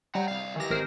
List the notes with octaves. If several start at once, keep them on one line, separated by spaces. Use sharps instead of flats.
G3 F#5 A#5
C2 F5
D#3 E3 G4 A#6
G#1 A#4 C5